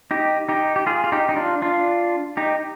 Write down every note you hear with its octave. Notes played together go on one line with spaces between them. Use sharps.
D#4 G4
D#4 G4
G4
F4 G#4
F4
D#4 G4
D#4
D4 F4
D4 F4
D#4 G4